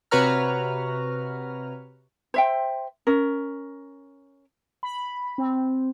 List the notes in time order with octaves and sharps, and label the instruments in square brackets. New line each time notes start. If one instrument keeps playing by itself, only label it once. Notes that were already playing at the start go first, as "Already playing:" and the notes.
[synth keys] C3 F#4 B4 C#5 A#5 F6
[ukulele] C5 E5 G5
C#4 A#4
[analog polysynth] B5
C4